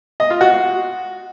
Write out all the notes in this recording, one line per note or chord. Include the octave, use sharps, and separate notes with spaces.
D#5
F4
F#4